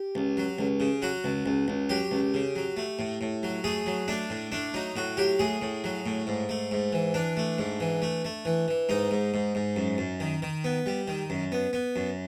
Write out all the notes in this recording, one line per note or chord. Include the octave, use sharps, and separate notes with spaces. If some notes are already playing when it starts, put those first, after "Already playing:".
Already playing: G4
C#2
F#3
C#2
C#3
F#3 F#4
C#2
C#2
C#2
F#3 G4
C#2
C#3
F#3
A3
A2
A2
F#3
A3 G#4
F#3
A3 D4
A2
A3 D4
F#3 D#4
A2 F#4
F#3 G4
A2 G#4
A2
F#3
A2
G#2
A3
G#2
E3
E3 D4
A3
G#2
E3
A3
A3
E3
E3
G#2 D#4
G#2
G#2
G#2
F#2
F#2
D#3
D#3
B3
G3
D#3
F#2
B3
B3
F#2